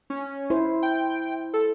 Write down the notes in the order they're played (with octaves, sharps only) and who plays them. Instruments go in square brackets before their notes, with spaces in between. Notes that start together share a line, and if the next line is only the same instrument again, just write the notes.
[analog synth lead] C#4
[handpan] E4 C5
[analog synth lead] G5
A4